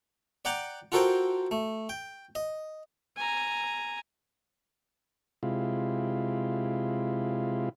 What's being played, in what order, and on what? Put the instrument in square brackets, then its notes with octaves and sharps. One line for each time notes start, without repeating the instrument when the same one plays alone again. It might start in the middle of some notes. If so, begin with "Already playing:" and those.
[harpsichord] D5 F#5 G5 A#5 D6
F4 F#4 A4 A#4 C5 G5
A3
G5
D#5
[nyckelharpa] G#5 A#5
[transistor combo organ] C3 G#3 E4 F4